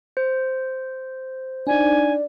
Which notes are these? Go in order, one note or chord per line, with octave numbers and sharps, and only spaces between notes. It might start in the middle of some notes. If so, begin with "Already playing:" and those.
C5
D4 D#4 D5 G#5